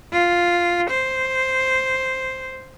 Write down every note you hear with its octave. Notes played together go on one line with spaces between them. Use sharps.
F4
C5